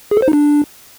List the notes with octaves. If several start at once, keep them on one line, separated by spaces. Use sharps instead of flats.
G#4
A4
C5
D#4
D4